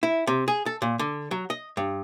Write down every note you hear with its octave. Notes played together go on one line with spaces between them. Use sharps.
E4
C3
G#4
A4
A#2
D3
F#3
D#5
G2